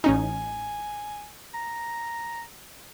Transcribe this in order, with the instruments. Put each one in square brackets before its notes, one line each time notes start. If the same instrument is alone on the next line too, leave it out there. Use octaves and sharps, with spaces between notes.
[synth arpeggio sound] A1 C#4 D#4 [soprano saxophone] G#5
[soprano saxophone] A#5